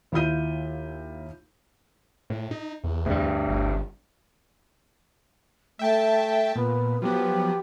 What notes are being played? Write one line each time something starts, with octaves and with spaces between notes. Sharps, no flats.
D#2 E4 F4 G6 D#7
A2
D#4
E2
D2 G2
G1
A3 E5 G5 A5
A#2 B3
F3 F#3 B3 G4